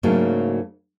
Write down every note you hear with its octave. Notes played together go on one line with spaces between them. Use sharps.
G#2 C#3 F#3 A3 A#3 D4